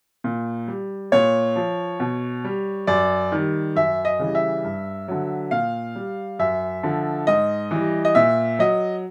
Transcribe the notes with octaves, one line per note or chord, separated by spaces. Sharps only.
A#2
G3
A#2 C#5
F3
B2
G3
F#2 D5
D#3 G3
F#2 E5
D#5
C#3 E3 G3
E5
G2
D3 F#3
A#2 F5
G3
F#2 E5
D3 F3
G#2 D#5
E3 G3
D#5
A#2 E5
F#3 D#5